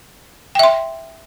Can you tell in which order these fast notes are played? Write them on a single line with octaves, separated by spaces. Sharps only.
G5 E5 C6